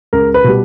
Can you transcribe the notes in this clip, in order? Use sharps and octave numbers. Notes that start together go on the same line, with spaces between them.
C#2 A#4
B4
B2 G3